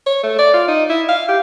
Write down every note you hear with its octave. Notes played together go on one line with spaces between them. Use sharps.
C#5
A3
D5
F4
D#4
E4
F5
G4